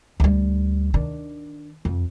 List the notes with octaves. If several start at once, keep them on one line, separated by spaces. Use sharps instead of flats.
D2 G3
D#3 D4
F2